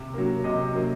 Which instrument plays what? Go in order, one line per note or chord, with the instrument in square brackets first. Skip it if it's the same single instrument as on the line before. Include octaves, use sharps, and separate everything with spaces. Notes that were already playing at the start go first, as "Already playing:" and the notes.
Already playing: [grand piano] C3
F#3 A#3
C3 D#5
F#3 A#3